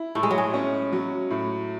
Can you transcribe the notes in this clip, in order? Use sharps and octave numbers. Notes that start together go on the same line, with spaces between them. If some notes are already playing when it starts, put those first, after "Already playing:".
Already playing: E4
A2 A3
G#3
F#3
G#3
C#4
F#3
A2